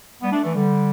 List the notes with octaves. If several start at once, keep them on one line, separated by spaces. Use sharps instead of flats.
G3 B3
A3 D4
E3 A3
D3 G3